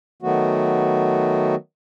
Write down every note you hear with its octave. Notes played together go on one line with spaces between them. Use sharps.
D#3 F#3 A3 B3 F#4